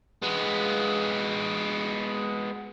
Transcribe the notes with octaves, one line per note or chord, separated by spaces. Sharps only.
G#3 B3